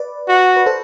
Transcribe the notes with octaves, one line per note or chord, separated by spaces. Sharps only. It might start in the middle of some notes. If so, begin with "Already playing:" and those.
Already playing: B4 D5
F#4
B4
A4 C5